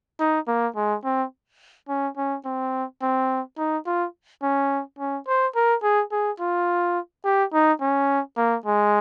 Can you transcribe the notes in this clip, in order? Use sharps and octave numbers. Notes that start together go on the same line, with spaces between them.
D#4
A#3
G#3
C4
C#4
C#4
C4
C4
D#4
F4
C#4
C#4
C5
A#4
G#4
G#4
F4
G4
D#4
C#4
A#3
G#3